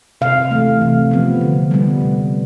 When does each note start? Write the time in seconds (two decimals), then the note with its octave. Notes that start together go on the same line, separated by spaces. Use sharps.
0.21 C3 F5
0.51 E3 A3
0.81 C3
1.11 F3 B3
1.41 D3
1.71 G3 B3
2.01 C3